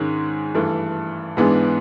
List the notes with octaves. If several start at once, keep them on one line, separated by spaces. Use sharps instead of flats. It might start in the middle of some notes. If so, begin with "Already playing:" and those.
Already playing: G#2 D#3 G#3 C#4
G2 E3 A3 D4
G#2 E3 G#3 B3 D4